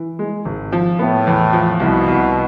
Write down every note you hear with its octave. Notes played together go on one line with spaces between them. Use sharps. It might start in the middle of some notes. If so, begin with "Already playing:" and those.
Already playing: E3
G#3
G#1
F3
A2 B3
E2
F3
C2 B2
C2